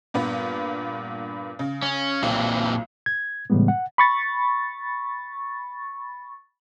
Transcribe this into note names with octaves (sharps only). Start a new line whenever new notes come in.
G2 A#2 B3
C#3
C#4
B1 A#2 E3 C4
G#6
A2 C#3 E3 G3 G#3 B3
F#5
B5 C#6 A6